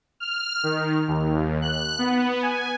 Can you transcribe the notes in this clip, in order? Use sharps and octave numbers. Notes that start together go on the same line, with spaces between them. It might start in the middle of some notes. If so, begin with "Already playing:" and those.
F6
D#3
D#2
F#6
B3
G#5